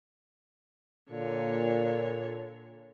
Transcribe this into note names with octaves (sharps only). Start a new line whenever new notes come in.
A#2 D3 C#5